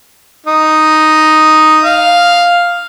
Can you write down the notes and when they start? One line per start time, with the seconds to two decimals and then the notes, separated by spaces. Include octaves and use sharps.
0.46 D#4
1.85 F5